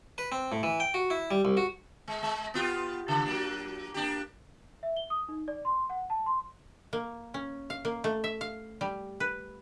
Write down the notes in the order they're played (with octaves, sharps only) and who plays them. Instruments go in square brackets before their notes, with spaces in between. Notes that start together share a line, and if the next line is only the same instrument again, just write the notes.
[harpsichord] B4
C4
A2
E3
G5
F#4
E4
G3
C2
F#4
[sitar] G#3
G#3
B3 F4 G4
C#3
F#3 A#3 D4
A#3 D4 G4
[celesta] E5
G7
D#6
D#4
D5
C6
F#5
A5
C6
[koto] A#3
C#4
F5
A#3
A3
E5
F5
G3
B4